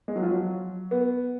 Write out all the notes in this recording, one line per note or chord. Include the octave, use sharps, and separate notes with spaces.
G#3
F#3
F3
F#3
B3